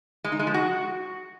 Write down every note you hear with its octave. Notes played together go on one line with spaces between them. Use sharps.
G#3
D#4
G#3
F3
F#4